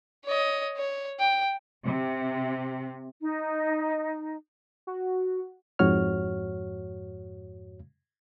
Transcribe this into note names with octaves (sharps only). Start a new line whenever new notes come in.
C#5 D#5
C#5
G5
C3
D#4
F#4
F2 G#2 F#4 C#5 F6